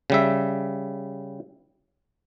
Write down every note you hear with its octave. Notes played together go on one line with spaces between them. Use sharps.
C#3 G3 E5